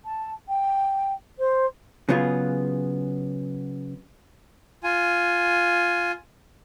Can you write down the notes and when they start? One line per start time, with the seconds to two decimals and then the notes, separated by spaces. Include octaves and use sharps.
0.04 A5
0.48 G5
1.38 C5
2.09 C#3 F#3 B3 F4 G#4
4.84 F4 G#5